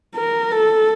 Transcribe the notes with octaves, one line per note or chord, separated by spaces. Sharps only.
A#4
A4